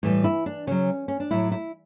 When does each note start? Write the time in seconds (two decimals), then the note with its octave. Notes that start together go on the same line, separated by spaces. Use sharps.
0.03 A2 E3 G3
0.24 E4
0.46 D4
0.67 C#3 F#3 C#4
1.08 C#4
1.20 D4
1.31 A2 F#3 E4
1.52 E4